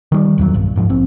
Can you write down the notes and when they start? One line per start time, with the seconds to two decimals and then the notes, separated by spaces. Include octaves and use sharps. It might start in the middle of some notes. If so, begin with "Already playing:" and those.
0.12 D#3 G3
0.38 D1 E2 F3 F#3
0.54 B1 G2
0.76 E2 G#2 F3
0.90 A#1 C4